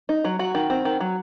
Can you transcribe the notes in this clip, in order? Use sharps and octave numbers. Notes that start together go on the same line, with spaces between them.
D#4
F#3
F#3 F#4
D#3
C4
D#3
F#3